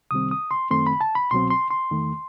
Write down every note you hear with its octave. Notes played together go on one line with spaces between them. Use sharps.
C2 C3 D#3 G3 C4 D#6
D#6
C6
F#2 D#3 A3 C4 C6
B5
A5
B5
C2 B2 F#3 C4 C6
C6
C6
E2 D#3 A3